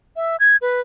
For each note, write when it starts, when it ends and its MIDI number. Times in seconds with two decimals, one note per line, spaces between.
0.16 0.36 76
0.40 0.56 92
0.62 0.81 71